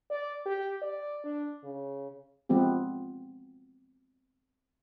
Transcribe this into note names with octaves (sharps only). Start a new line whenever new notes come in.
D5
G4
D5
D4
C#3
F3 G#3 B3 C4 G4